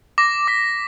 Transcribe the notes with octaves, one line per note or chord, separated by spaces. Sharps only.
D6 A#6
D6 B6